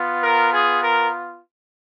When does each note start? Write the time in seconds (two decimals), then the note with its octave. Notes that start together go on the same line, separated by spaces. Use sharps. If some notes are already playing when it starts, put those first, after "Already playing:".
Already playing: B3 F4
0.22 A#4
0.52 G#4
0.82 A#4